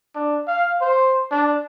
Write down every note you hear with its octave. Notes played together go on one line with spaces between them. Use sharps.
D4
F5
C5
D4